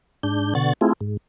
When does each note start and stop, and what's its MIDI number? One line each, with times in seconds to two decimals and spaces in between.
0.23 0.54 44
0.23 0.54 62
0.23 0.54 91
0.55 0.73 47
0.55 0.73 50
0.55 0.73 78
0.55 0.73 85
0.55 0.73 93
0.81 0.93 57
0.81 0.93 60
0.81 0.93 64
0.81 0.93 65
0.81 0.93 68
1.01 1.17 44